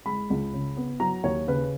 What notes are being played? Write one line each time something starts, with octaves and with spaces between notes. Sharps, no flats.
G#3 B5
C#2
C#3
B3
F#3 A#5
D#2 C#5
C#3 B4